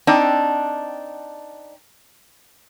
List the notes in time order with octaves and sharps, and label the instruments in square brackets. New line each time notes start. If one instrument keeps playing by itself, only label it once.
[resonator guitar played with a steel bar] C4 D4 D#4 G5